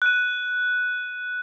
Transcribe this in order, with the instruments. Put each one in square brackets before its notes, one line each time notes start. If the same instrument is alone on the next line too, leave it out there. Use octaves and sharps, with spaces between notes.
[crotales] F#6 D#7